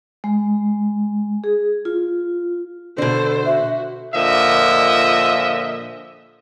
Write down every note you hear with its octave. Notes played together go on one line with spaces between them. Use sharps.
G#3
G#4
F4
B2 D3 A4 C5
F#4 E5
A#2 D3 F3 D#5 E5